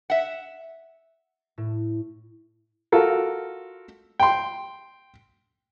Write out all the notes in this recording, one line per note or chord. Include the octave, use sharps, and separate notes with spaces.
E5 F#5
A2
F4 F#4 A4 A#4
G5 C6